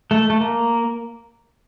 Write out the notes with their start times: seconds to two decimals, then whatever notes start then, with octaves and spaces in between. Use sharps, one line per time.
0.11 A3
0.30 A3
0.40 A#3